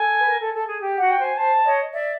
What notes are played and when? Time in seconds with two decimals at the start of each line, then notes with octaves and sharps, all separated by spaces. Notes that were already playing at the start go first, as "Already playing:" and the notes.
Already playing: A4 G#5
0.19 B4
0.25 A#4
0.40 A4
0.53 A4
0.68 G#4
0.81 G4
0.97 F#4 F#5
1.10 G5
1.19 C5 G#5
1.37 C5 A5
1.65 C#5 D#5
1.93 D5 E5